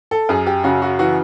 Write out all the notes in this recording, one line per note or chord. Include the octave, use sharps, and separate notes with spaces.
A4
F#2 G#4
G4
C#3 F#4
F#4
E3 F#4